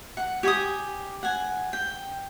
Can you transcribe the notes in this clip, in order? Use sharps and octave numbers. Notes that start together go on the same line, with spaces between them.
F#5
G4 G#5 C#6 D#6
F#5 G#5
G5